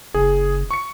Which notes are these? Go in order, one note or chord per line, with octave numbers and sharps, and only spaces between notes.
F#1 G#4
C#6 C#7